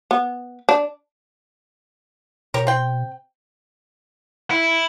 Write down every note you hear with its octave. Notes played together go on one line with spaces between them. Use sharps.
B3
D4
B2 G4 A#4 C#5
C4 G5
E4